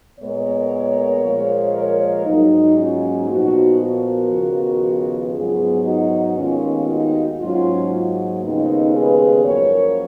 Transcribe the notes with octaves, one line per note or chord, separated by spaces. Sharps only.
A#2 G#3 B3 A#4 C#5
A#2 F3 G#3
A#4 C#5
G#2 F#3 A#3 D#4
C#4 F4
A#2 F3 B3 D#4 F#4
F#4 A#4
D#2 C#3 F3 B3
G#2 F#3 B3 F4 G#4
D#4 F#4
D#2 D#3 G#3 B3 C#4 F4
D#4 F#4
G#2 F#3 A#3 C#4 F4
D#2 C#3 F3 G#3 B3 D#4
G#4 B4
F#2 F3 A#3 A#4 C#5